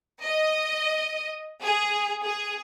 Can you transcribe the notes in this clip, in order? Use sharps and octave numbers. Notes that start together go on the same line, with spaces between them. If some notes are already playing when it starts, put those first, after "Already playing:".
D#5
G#4
G#4